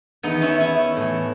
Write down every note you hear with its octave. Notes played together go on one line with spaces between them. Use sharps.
E2 D#3 B3 D#4
C#4 E4
C#4 E4
A2 E3